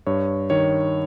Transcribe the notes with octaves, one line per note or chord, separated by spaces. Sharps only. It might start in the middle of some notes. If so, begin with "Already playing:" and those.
G2 C#5
D#3 C#5